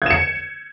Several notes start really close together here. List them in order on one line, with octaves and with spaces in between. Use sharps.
G#6 E7 C#7